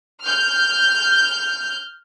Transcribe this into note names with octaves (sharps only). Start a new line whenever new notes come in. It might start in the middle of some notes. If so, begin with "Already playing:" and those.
F6 G6